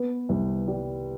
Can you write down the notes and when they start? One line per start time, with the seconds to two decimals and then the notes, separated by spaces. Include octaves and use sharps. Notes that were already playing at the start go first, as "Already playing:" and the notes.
Already playing: B3
0.29 C2
0.67 G3